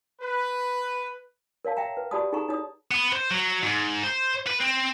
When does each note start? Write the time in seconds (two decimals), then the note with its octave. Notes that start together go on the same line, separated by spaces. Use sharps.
0.21 B4
1.65 A#4 C#5 F5 A5
1.77 E5 F#5 G5 A#5
1.97 B4
2.11 F#4 G4 D5 A5 B5 D#6
2.32 D#4 G#4 A4 F#5 A#5 C#6
2.48 D#4 C#5 D#6
2.91 B3
3.12 C5
3.31 F#3
3.63 G#2
4.04 C5
4.47 B4
4.60 C4